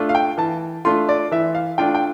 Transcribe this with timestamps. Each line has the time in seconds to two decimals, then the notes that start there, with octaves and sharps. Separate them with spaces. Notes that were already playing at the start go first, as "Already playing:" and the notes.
Already playing: A3 D4 F4
0.09 F5
0.15 G5
0.38 E3 A5
0.85 A3 D4 F4 C6
1.09 D5
1.31 E3 E5
1.55 F5
1.78 A3 D4 F4 G5
1.95 G5